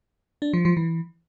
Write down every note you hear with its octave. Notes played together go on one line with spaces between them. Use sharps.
D4
F3
F3
E3